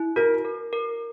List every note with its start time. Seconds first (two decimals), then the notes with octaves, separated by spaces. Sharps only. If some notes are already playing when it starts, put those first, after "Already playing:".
Already playing: E4
0.16 F#4 A#4
0.45 A#4
0.73 A#4